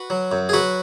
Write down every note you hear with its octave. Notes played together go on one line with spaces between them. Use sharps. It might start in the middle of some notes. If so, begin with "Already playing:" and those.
Already playing: F#4 B4
F#3
F#2
G#4
F#3 F#4 B4